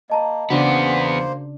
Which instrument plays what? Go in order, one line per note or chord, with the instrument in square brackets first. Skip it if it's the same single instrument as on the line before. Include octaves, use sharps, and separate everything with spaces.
[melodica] A#3 [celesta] D#5 A5 A#5
[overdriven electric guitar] E2 B3 [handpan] C#3 D4 D5 [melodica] A#3 C5 [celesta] F#4